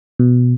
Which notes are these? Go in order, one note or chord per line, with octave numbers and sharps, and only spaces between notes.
B2